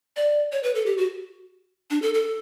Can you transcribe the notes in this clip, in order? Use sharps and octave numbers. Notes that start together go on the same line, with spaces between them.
D5
C#5
B4
A4
G4
F#4
D4
A4
A4